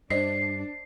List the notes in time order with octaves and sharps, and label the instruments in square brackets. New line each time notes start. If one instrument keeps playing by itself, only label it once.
[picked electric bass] G2 [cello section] D4 [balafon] C5 D5 D#5 [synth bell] C7